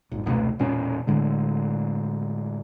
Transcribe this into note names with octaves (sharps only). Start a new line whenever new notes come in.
D#1 G#1
F1 C#2 B2 A3
E1 A#2 C#4
A2 D3 G#3